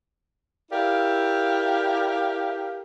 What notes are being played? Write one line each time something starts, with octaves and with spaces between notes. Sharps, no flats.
E4 G4 A4 A#4 D5 F5